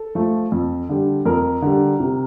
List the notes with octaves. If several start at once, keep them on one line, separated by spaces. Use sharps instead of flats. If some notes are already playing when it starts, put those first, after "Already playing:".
Already playing: A4
F3 A3
F2
D3 G3
F2 A#4
D3 G3
C3